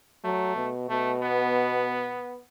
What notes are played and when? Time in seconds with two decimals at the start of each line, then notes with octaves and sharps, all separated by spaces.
0.24 F#3 A3
0.56 B2
0.89 B2 A3
1.22 B3